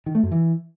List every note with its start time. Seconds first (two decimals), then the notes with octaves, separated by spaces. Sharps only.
0.06 D#3
0.15 A3
0.23 F#2
0.31 E3